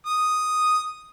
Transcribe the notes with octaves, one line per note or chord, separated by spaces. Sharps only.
D#6